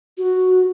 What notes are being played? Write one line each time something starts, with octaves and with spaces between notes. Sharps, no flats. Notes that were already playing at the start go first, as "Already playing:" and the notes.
F#4